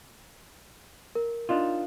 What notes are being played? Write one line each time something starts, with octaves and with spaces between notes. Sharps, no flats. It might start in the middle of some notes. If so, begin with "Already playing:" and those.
A#4
D4 D#4 F4